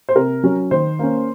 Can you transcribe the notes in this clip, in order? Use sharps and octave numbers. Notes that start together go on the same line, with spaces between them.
C5
C3 A#4
F#3 C#4
D#3 C5
A#3 C#4